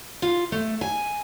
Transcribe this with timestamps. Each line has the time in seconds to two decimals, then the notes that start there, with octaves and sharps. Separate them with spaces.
0.22 F4
0.52 A3
0.81 G#5